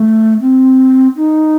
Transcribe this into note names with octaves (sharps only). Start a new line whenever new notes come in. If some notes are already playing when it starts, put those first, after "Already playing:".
Already playing: A3
C4
D#4